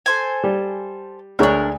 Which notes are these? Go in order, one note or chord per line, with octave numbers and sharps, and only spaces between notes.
A4 C5 G#5
G3
D2 G#3 D4 A#4 C#5